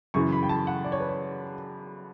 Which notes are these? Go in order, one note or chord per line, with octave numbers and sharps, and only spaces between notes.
F#2 C#3 E3 C#6
B5
G5
A5
F#5
D5
C#5
B4
C#5